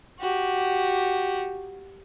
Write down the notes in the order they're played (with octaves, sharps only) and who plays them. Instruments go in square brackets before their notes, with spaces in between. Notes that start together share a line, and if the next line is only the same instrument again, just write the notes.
[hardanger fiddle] F#4 G4